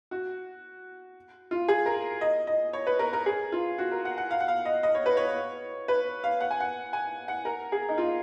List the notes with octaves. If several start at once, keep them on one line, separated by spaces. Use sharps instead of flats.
F#4
F4
G#4
A#4
D#5
D#5
C#5
B4
A#4
A#4
G#4
F4
F#4
A#4
F#5
F#5
F5
F#5
F5
D#5
D#5
C#5
B4
C#5
B4
F5
F#5
G#5
F#5
G#5
F#5
A#4
G#4
D#4
F4